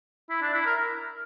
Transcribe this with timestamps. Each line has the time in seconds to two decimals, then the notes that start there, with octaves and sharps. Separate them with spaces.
0.30 E4
0.42 D4
0.54 E4
0.66 A#4